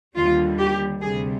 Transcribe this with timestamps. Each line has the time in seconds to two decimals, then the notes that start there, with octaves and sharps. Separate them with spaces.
0.16 D#2 D3 G3 F4
0.58 G4
1.01 D2 C3 G3 G#4